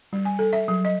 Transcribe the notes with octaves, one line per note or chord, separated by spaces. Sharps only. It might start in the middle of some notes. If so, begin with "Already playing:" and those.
G3
G#5
A4
E5
F#3
D#5